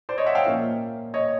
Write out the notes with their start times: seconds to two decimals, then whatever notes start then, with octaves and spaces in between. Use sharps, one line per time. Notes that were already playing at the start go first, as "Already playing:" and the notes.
0.09 C5 D5
0.18 C#5 D#5
0.26 E5 F#5
0.35 F5 G5
0.44 A#2 F3 A#3 C#4
1.14 C#5 D#5